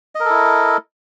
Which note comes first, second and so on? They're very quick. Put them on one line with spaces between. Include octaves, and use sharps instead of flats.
D#5 A#4 A4 E4